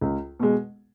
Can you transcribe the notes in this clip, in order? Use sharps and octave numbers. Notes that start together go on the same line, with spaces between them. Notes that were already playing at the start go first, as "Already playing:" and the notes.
C#2
B2 G#3